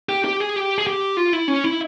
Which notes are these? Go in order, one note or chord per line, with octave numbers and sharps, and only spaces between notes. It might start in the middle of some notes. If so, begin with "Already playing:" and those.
G4
G4
G#4
G4
G#4
G4
F4
E4
C#4
E4